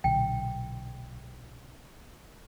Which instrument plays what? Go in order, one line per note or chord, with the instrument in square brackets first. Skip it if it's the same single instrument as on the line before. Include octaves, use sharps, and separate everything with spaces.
[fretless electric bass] B1 A#2 D3 [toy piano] G5